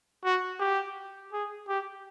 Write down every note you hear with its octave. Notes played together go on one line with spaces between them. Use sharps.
F#4
G4
G#4
G4